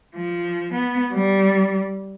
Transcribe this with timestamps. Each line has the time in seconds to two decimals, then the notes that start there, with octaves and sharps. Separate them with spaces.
0.15 F3
0.73 B3
1.13 G3